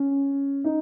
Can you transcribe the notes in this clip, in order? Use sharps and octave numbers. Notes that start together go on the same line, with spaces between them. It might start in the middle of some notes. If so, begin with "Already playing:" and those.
Already playing: C#4
D#4